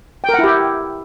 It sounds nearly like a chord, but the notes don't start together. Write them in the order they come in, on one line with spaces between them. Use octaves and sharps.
G5 A#4 F#5 E4 G4